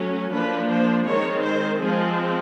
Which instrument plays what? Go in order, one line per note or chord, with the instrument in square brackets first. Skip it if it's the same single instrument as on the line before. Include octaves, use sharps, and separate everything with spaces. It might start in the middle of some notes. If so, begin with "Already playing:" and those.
Already playing: [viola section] F#3 A3 C#4
F3 A#3 D4 B4
C5
D#3 G#3 C4 C#5
C5
F3 G#3 C4 G#4